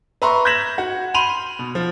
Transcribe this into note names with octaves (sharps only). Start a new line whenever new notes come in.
B4 E5 A#5 C6 C#6
G6 G#6 A#6 B6 E7 F#7
F#4
B5 C6 D#7 F7 F#7
B2
F3